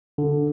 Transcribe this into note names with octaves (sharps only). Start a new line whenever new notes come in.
D3